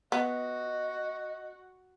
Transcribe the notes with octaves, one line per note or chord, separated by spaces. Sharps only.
B3 F#4 D#5